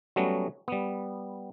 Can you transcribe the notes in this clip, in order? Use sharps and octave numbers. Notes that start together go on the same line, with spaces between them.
F#3 G3 A3 B3 C#4 F#4
G3 B3